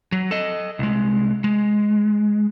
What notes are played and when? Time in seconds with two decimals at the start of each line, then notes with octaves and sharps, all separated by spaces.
0.12 F#3
0.31 A4 D#5
0.79 C2 G#3
1.44 G#3